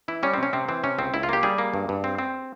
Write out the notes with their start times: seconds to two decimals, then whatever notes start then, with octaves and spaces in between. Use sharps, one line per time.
0.08 E3 E4
0.23 G3 C#4
0.34 C3 C4
0.43 C#4
0.53 C3 C4
0.68 E3 C4
0.83 C3 C#4
0.98 C#2 C4
1.14 C#2 E4
1.23 F4
1.29 A#3 G4
1.43 G3 G#4
1.58 A#3
1.74 G2
1.89 G2
2.04 C4
2.19 C4